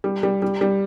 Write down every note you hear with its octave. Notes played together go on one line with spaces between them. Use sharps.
G3
G3
G3
G3